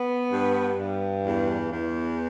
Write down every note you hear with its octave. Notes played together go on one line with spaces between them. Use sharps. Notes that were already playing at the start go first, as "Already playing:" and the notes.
Already playing: B3
G2
G2
E2
E2